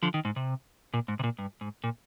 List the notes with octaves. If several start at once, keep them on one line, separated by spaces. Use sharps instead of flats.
D3 F3
D#3
G#2
C3
A#2
G#2
C3
A#2
G2
G#2
A#2